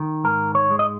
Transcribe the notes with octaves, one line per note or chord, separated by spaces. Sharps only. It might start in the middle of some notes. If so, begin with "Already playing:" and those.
Already playing: D#3
G#2 A#4
C#5
G#3
D#5